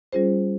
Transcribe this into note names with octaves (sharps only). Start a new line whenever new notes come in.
G3 C#4 F4 G#4 C5